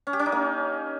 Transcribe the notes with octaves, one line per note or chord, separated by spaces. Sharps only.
C#4
G4
C#4
D#4
A#3